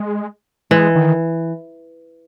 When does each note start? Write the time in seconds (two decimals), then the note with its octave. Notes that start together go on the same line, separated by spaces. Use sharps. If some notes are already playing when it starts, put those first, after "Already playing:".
Already playing: G#3
0.71 E3 G#3
0.95 D#3